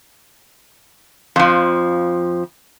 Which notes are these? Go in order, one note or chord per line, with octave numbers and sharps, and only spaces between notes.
F2 F3